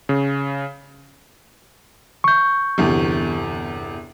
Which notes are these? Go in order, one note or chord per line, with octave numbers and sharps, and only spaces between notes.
C#3
C#6 G6
G1 E2 C3